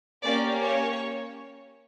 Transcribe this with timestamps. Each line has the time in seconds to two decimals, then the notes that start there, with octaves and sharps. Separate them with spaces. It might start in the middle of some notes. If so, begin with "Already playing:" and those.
0.23 A#3 C#4 G4 D5
0.62 C#5